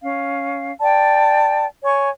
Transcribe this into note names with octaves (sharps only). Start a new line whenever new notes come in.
C#4 F5
D5 G5 A5
C#5 G#5 C#6